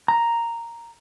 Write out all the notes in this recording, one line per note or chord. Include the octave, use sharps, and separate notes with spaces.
A#5